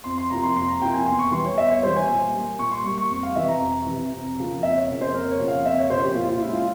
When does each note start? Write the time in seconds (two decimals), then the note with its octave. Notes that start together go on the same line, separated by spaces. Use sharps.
0.04 F2 C6
0.18 C6
0.30 C3 F3 A#3 E4 A#5
0.43 C6
0.56 F2 C6
0.68 A#5
0.81 C3 F3 A#3 E4 G5
0.93 G#5
1.06 E2 C6
1.19 C#6
1.31 E3 G3 C6
1.45 C#5
1.57 E2 E5
1.70 C#5
1.82 E3 G3 C5
1.96 G#5
2.08 A#2
2.34 G3 A#3
2.59 A#2 C#6
2.72 C6
2.85 G3 A#3 C#6
2.98 C#6
3.10 F2
3.23 F5
3.36 C3 E3 E5
3.48 A#5
3.61 F2
3.86 C3 E3
4.13 F2
4.37 C#3 F3 A#3
4.63 F2 E5
4.76 C#5
4.88 C#3 F3 A#3
5.01 C5
5.14 F2 A#4
5.31 C#5
5.40 C#3 F3 A#3
5.48 F5
5.65 F2 E5
5.78 C#5
5.90 C#3 F3 A#3 C5
6.04 G4
6.15 A#2 F4
6.29 F4
6.41 G#3 C#4 E4
6.54 F4